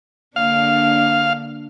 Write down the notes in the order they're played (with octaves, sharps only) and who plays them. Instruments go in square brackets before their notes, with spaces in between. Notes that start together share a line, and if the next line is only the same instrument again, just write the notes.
[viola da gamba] D3 A#3 D4 [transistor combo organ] F5